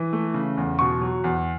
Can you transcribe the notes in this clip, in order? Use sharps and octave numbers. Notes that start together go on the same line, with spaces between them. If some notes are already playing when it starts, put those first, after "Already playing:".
Already playing: E3
A3
C#3
E2
B2 C#6
F#3
E2